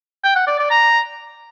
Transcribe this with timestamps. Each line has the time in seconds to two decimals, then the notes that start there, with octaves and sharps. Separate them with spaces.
0.24 G5
0.35 F#5
0.47 D5
0.59 D5
0.70 A#5